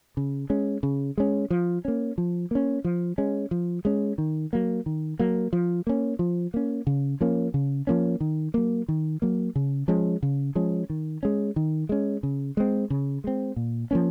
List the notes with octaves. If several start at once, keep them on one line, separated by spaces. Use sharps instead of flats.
C#3
G#3 C#4
C#3
G#3 C#4
F3
A#3 C#4
F3
A#3 C#4
F3
G#3 C#4
F3
G#3 C#4
D#3
F#3 A#3
D#3
F#3 A#3
F3
A#3 C#4
F3
A#3 C#4
C#3
F3 A#3 C#4
C#3
F3 A#3 C#4
D#3
F#3 A#3
D#3
F#3 A#3
C#3
F3 G#3 C#4
C#3
F3 G#3 C#4
D#3
G#3 C#4
D#3
G#3 C#4
C#3
G#3 C4
C#3
G#3 C4
A#2
F3 A#3 C#4